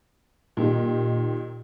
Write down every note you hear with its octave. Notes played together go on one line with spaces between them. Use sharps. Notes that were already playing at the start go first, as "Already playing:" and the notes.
A#2 D#3 G4